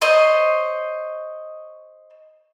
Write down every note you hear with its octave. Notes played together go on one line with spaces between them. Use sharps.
C5 C#5 D#5 C6